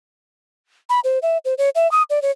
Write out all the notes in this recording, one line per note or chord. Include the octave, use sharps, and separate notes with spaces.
B5
C5
E5
C5
C#5
E5
D#6
D5
C#5